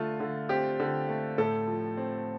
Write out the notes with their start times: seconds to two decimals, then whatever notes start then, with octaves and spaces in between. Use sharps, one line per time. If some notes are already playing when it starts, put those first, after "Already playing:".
Already playing: D3 A3 F4
0.20 D3
0.49 C4 G4
0.80 D3
1.09 A3
1.38 A2 A4
1.68 F3
1.97 C4